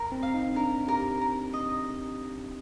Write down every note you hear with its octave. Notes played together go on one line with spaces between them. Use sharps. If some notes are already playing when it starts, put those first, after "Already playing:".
Already playing: A#4
C4
F5
D#4
D4 A#4
G4 A#4
A#4
D#5